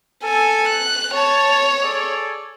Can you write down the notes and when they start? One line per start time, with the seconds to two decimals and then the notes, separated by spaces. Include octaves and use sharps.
0.24 A4 G#5
0.69 F#6
1.14 C#5 A5
1.83 G#4 A4 D5